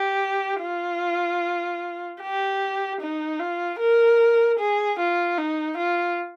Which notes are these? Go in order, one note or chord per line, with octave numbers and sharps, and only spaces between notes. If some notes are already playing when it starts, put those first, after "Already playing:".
Already playing: G4
F4
G4
D#4
F4
A#4
G#4
F4
D#4
F4